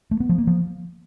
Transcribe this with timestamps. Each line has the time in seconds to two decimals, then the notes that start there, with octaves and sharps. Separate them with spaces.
0.11 A3
0.20 B3
0.29 F3
0.38 A#3
0.47 F3